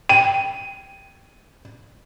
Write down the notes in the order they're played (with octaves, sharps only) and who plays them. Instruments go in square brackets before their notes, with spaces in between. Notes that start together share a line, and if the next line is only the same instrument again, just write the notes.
[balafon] G5 [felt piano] D#7